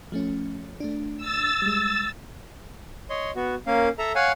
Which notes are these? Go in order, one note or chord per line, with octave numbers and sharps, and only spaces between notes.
F3 A3 C#4
A3 D4
E6 A6
G3 G#3
C#5 D#5 C6
B3 F#4
A#3 C#4 A#4 F5
A4 E5 A#5
C#5 F5 F#5 G#5